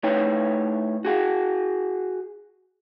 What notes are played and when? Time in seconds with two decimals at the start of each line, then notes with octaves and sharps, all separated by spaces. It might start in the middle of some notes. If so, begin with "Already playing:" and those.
0.03 A2 D#4 B4 C#5 G5
1.05 F#4 G#4 F#5